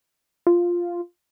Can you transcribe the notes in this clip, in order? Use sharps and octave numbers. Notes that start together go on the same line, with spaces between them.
F4